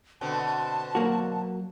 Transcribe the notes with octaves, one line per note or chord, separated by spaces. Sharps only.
B2 D3 C4 A5
F#3 A#3 F#4